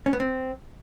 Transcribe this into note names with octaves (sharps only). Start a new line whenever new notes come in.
C#4
B3
C4